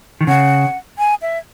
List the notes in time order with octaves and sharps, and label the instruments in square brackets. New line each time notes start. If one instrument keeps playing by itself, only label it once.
[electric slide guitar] D#3
[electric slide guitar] C#3 [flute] F#5
[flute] G#5
E5